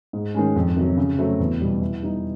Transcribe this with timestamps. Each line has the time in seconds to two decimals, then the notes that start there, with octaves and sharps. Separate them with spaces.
0.13 G#2
0.34 D#3 G#3 C#4
0.56 F2
0.77 C3 D#3 F#3
0.97 C#3
1.19 F#3 A3 C4
1.40 E2
1.60 B2 G3
1.81 E3
2.02 G3 B3 D#4